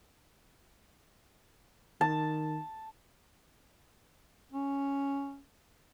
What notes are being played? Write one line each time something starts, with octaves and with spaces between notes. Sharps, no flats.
D#3 A5
C#4